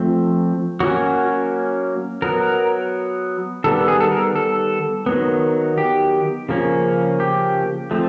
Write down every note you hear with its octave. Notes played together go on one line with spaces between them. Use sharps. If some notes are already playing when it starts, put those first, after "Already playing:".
Already playing: F3 A3 C4
F#3 A#3 C#4 F#4
F#3 B3 A#4
D#3 G3 B3 A4
G#4
A4
A#4
A4
D#3 F#3 B3
G4
C#3 F3 A#3 C#4
G4
F3 A3 C4